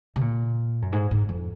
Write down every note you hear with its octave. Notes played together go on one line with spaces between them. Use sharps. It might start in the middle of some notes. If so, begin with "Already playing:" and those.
C3
A#2
F#2
G#2
G#2
F2